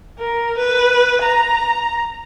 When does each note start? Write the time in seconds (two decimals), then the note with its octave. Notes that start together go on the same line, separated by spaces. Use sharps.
0.19 A#4
0.57 B4
1.22 A#5